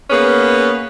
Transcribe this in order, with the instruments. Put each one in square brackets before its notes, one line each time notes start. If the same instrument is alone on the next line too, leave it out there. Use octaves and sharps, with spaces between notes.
[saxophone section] A#3 B3 C#4 G#4 B4